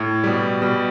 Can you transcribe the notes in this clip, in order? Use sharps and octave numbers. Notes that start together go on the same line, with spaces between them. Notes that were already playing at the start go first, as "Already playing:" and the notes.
Already playing: A2
B2 G3
B2 G3